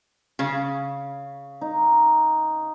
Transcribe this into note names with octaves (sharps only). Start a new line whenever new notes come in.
C#3 F5
D#4